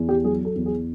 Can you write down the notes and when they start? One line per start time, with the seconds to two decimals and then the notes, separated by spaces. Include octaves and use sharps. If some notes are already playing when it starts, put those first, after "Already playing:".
Already playing: E2
0.09 G4
0.24 F#3 G#4
0.45 A4
0.55 E2
0.66 G#4